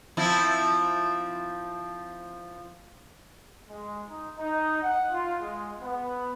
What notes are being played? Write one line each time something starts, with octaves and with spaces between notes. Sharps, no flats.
F3 C4 E4
G#3
D#4
D#4
F#5
F4
G#3
B3